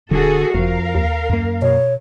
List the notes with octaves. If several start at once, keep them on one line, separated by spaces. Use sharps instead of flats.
D#1 D3 F#4 G#4 A4
F#1 F2 F3 A#4 F5
D#2
F#2 A#3
B2 C#5